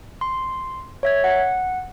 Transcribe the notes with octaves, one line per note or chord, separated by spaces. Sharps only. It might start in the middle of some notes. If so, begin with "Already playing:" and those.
C6
C#5 E5 G#6
F#5